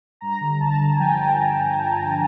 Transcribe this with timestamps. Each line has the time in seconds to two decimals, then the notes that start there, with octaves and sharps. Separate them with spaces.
0.21 G2 A#5
0.41 D3
0.60 G1 A5
0.80 D3
0.93 G#5
0.99 F3 G5
1.19 F3
1.38 G1
1.58 D3
1.77 D3
1.97 G1